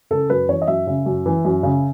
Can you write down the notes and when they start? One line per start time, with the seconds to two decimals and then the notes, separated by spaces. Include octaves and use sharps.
0.11 C#3 A4
0.30 F#2 B4
0.49 E3 C#5
0.62 D#5
0.68 F#2 E5
0.87 C#3
1.06 F#2
1.26 E3
1.45 F#2
1.63 C#3